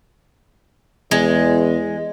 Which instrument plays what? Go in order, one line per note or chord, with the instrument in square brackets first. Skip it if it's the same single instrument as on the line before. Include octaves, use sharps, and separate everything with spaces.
[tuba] E2 [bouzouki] G#3